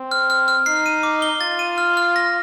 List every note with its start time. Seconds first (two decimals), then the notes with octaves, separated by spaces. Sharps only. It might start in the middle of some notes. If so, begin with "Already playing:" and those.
Already playing: C4
0.11 F6
0.30 F6
0.48 F6
0.66 D#4 C7
0.86 D#7
1.03 D6
1.22 G7
1.41 F4 A6
1.59 D#7
1.78 F6
1.97 F6
2.16 A#6